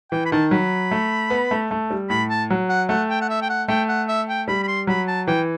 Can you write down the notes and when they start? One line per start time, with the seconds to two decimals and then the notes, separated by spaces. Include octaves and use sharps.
0.11 E3 G5
0.26 B5
0.32 D#3 A5
0.51 F#3 B5
0.91 A3
1.30 B3
1.51 A3
1.71 A3
1.90 G3
2.10 A2 B5
2.30 A5
2.50 F#3
2.69 F#5
2.89 A3 F#5
3.09 G5
3.22 F#5
3.29 E5
3.42 G5
3.50 F#5
3.68 A3 G5
3.89 F#5
4.08 E5
4.29 G5
4.48 G3 B5
4.63 B5
4.68 C6
4.87 F#3 B5
5.08 A5
5.27 E3 G5